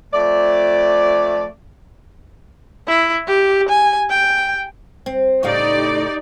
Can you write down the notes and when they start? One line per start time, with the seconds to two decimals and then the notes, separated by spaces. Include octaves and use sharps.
0.13 F2 A3 D5
2.87 E4
3.27 G4
3.69 G#5
4.10 G5
5.06 C4
5.43 A2 C#3 D#4 G4 D5 F5